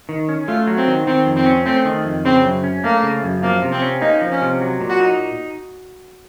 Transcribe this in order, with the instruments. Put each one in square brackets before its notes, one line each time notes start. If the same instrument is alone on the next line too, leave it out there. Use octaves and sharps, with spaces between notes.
[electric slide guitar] D#3
C#4
[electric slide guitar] A3 [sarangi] F4
[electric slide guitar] F#3
[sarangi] C4
[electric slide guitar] D#3
[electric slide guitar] D#3 [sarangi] C4
[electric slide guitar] F2
[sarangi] C4
[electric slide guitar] C#4
[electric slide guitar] A3 [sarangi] C4
[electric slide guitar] D#3
F2
[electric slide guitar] C#3 [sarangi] C4
[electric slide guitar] F#2
C#4
[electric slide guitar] A3 [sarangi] A#3
[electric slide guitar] C#3
F#2
[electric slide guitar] F3 [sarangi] A#3
[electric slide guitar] C3
[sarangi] C4
[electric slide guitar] C#4
[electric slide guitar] A#3 [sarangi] D#4
[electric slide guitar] F3
[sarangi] C#4
[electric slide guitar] C3
F#3
A#2
[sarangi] F#4
[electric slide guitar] D#4